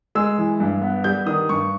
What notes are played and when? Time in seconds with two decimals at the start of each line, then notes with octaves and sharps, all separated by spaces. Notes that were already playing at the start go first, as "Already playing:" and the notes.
0.15 G#3 E6
0.38 E3
0.60 G2
0.82 B3
1.04 G3 G6
1.26 D#3 D#6
1.49 G2 C#6